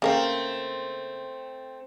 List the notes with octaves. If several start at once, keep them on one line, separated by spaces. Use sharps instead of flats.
C#3 A3 A#3 C4 A#4